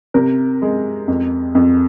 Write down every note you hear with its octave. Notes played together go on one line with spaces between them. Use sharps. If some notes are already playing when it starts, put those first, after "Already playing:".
C3 A#4
G#3
F2
F2